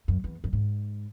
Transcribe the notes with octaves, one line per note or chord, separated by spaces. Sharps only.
F#2
E2
F#2
G#2